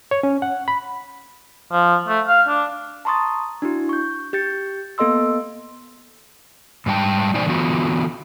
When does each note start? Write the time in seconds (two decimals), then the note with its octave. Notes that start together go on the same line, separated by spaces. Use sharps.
0.11 C#5
0.23 C#4
0.42 F#5
0.68 B5
1.72 F3
2.08 A3
2.28 F5
2.48 D4
3.05 A5 A#5 C6 C#6 D#6 A6
3.62 D4 E4 F#4
3.89 C#6 G6
4.33 G4 G6 A6 C#7
4.98 A#3 B3 A4 D#5 C6 E6
6.86 G#2 G3 G5 A5
7.34 A#2 E3 D#4 C5 D5 G#5
7.46 D3 E3 B3 F4 F#4